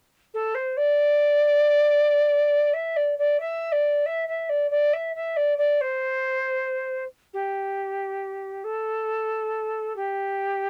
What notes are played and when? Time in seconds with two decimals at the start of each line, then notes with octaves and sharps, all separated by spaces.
0.34 A4
0.55 C5
0.77 D5
2.73 E5
2.96 D5
3.18 D5
3.40 E5
3.72 D5
4.06 E5
4.28 E5
4.49 D5
4.71 D5
4.93 E5
5.15 E5
5.36 D5
5.58 D5
5.81 C5
7.33 G4
8.64 A4
9.96 G4